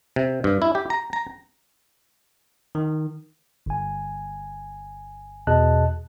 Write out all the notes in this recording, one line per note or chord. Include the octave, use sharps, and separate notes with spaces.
C3
G2
E4
G4
A#5
A#5
D#3
G1 G#5
E2 B2 G#4 D#5 A5 F#6